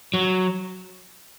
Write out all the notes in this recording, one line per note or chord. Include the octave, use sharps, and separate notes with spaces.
F#3